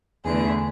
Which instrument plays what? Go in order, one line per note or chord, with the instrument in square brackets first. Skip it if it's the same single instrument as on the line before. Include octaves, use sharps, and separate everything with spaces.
[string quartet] E2 D3 A3 G#4